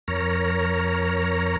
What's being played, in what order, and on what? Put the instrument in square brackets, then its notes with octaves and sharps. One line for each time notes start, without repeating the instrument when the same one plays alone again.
[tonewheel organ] F2 A#4 C#5 A#5